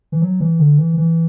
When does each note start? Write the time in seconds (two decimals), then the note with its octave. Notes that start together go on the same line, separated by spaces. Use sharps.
0.12 E3
0.22 F#3
0.40 E3
0.59 D3
0.79 E3
0.97 E3